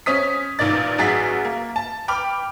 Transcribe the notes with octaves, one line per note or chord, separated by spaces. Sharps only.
C#4 C5 D#6 B6
A1 A#2 D#3 D5 A6
A1 F#3 F#4 G#4 A6 B6
A#3
A5
G5 B5 D6 F6